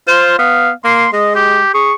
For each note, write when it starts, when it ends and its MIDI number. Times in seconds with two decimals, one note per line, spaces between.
0.08 0.38 65
0.08 0.36 72
0.39 0.71 59
0.39 0.71 77
0.85 1.07 58
0.85 1.10 84
1.13 1.61 56
1.13 1.33 75
1.36 1.73 67
1.74 1.93 68
1.74 1.94 85